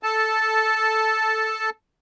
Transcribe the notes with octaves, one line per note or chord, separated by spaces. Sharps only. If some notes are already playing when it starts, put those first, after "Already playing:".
A4 A5